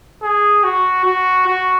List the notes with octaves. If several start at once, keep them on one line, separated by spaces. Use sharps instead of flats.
G#4
F#4
F#4
F#4